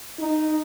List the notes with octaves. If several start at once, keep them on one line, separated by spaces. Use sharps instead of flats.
D#4